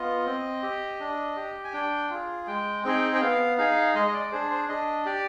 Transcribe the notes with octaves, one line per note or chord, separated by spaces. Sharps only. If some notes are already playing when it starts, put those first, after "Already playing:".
Already playing: B3 F4 D#5
C4
G4
D4
G4
G#5
D4 G5
F4 G#4
G#3 G5
C4 D#4 G#4 G5
G5
B3 F5
D#4 G#4 F5
G#3 D#5
D#5
D5
D4 G#4 C5
C5
D4 D#5
G4 D5